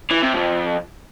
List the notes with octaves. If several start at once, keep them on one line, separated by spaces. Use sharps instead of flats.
E3
C3
F2